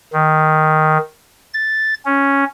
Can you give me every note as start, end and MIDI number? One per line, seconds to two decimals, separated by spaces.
0.13 0.98 51
1.54 1.94 93
2.05 2.44 61